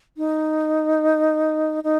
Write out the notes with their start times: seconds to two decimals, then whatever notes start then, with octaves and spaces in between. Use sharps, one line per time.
0.17 D#4
1.84 D#4